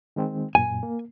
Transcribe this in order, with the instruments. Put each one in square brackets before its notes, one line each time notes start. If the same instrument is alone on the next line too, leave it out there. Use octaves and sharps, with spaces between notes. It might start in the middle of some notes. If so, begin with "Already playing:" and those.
[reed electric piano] D#3 G#3 C4
[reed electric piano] F#2 A#2 [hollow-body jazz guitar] G#5
[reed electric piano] A#3